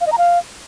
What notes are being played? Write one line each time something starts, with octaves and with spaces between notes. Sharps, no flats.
F5
D#5
A#5
F5